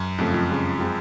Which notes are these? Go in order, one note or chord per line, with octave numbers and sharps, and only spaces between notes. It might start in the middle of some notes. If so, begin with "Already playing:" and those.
Already playing: F#2
F2 C#3 F3 A3
F2
C#3 F3 G#3
G#3 C4 F4